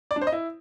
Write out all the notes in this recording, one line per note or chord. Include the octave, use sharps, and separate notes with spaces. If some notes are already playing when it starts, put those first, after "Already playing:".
D5
D4
C5
D#5
E4